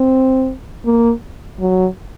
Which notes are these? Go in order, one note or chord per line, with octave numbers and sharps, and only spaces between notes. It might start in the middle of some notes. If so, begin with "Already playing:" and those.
Already playing: C4
A#3
F#3